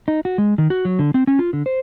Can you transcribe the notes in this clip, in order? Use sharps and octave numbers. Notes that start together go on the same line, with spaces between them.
D#4
F#4
G#3
D#3
F#4
F#3
D3
C4
C#4
F4
D3
C5